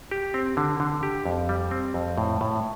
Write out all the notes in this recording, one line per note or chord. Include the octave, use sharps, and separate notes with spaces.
G4
C4
D3
D3
G4
F2
G3
C4
F2
A2
A2